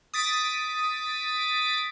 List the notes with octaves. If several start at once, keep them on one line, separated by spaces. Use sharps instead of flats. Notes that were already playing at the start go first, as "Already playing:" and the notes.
D#6 A6 B6 D7